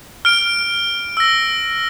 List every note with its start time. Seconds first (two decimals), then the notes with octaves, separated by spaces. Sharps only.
0.25 F6 D7
1.17 E6 A#6